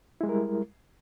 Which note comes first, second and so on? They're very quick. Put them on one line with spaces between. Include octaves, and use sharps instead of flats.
E4 G#3 G3 A#4